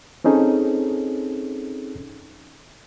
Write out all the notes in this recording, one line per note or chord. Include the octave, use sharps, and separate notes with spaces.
C4 C#4 D#4 G#4 A4